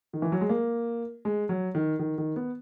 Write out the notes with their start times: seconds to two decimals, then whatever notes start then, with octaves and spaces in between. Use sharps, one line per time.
0.13 D#3
0.22 E3
0.32 F#3
0.41 G#3
0.49 A#3
1.25 G#3
1.49 F#3
1.75 D#3
1.99 D#3
2.18 D#3
2.36 B3